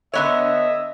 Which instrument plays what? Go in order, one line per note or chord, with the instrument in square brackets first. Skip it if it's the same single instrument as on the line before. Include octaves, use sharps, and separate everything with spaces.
[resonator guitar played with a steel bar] D3 B3 C#5 [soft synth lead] D#5 [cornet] E5